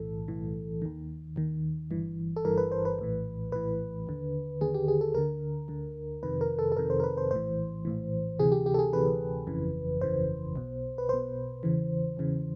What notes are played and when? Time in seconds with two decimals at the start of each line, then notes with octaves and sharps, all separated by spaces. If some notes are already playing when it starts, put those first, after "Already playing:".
Already playing: B1 A2 E3 A4
0.28 B1 A2 E3
0.82 D#2 D#3
1.36 D#2 D#3
1.91 G1 G2 E3
2.36 A4
2.45 G1 G2 E3 A#4
2.58 B4
2.72 C5
2.85 B4
2.99 A#1 A2 E3
3.52 A#1 A2 E3 B4
4.07 D#2 D3
4.61 D#2 D3 G#4
4.74 G4
4.88 G#4
5.01 A4
5.14 D2 D3 A#4
5.68 D2 D3
6.23 F2 C3 D#3 B4
6.41 A#4
6.59 A4
6.72 A4
6.77 F2 C3 D#3 A#4
6.90 C5
7.00 A#4
7.04 B4
7.17 C5
7.31 A#1 A2 E3 C5
7.85 A#1 A2 E3
8.39 D2 C3 E3 G#4
8.52 G4
8.66 G4
8.74 A4
8.79 G#4
8.93 D2 C3 E3 B4
9.47 G1 F2 C#3 E3
10.01 G1 F2 C#3 E3 C5
10.56 B1 B2
10.98 B4
11.09 B1 B2 C5
11.63 E2 C#3 E3
12.17 E2 C#3 E3